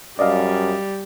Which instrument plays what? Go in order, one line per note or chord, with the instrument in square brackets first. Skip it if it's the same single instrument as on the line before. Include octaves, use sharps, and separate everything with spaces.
[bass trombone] F#2 [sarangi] G3 [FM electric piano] D5 D#5 F5